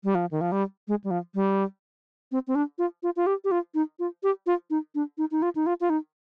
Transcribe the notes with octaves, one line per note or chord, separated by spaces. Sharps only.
G3
F3
D#3
F3
G3
G#3
G3
F3
G3
C4
C4
D4
F4
F4
F4
G4
G4
F4
D#4
F4
G4
F4
D#4
D4
D#4
D#4
F4
D#4
F4
F4
D#4